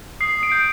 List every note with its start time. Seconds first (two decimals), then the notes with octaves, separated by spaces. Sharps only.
0.20 D#6 C7
0.43 D7
0.52 G6